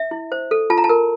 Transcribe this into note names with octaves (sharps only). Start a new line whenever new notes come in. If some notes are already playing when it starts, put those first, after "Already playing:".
Already playing: E5
E4
C5
A4
F4 A5
A#5
A5
A#4